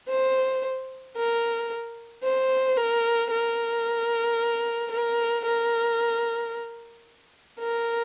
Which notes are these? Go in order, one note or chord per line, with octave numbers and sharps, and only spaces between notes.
C5
A#4
C5
A#4
A#4
A#4
A#4
A#4